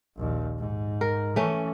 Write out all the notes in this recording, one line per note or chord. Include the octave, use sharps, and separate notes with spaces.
A#1 D#2
G#2
A#4
E3 A3 C#4